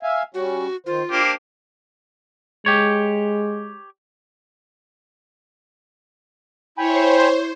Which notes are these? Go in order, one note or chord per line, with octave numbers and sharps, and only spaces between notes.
E5 F5 G#5
G3 C#4 F#4
D#3 F4 C5
A#3 D4 G4 C5
G#3 G4 C#5
E4 C5 C#5 G5 G#5 B5